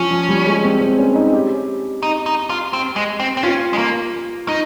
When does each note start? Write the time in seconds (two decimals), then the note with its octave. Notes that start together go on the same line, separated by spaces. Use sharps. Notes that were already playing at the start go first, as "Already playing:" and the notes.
Already playing: F3 C#4
0.11 F3
0.29 G3
0.46 G#3
0.64 C4
0.81 C4
0.98 C#4
1.15 D#4
1.33 G4
2.03 D#4
2.26 D#4
2.50 F4
2.73 C4
2.96 G#3
3.20 C4
3.37 C4
3.43 C#4 F4
3.73 G#3
3.78 A#3
4.48 D#4